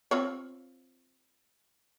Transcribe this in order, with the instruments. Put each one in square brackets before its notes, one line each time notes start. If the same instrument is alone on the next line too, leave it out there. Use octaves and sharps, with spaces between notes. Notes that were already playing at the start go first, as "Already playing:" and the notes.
[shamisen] C4 F4 C#5